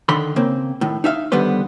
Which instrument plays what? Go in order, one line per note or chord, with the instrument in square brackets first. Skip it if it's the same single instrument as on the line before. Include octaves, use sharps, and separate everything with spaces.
[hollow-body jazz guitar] D3 D#3 B5 C6
C#3 A#3 C4
A2 D#3
D#4 E5 F5
D3 D#3 G3 B3 B4 C5